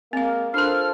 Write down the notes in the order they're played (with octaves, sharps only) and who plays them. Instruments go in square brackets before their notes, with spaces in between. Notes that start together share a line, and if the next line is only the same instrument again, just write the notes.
[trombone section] G#3 A#3 [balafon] C4 F5
[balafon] D4 A#4 [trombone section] F4 A4 C5 [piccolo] F6